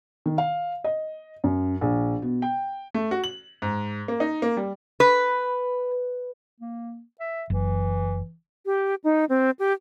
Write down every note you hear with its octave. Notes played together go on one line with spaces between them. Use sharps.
D#3
F5
D#5
F#2
A#1
B2
G5
A3
F#4
F#7
G#2
A#3
D#4
A#3
G3
B4
A#3
E5
F#1 E3
G4
D#4
C4
G4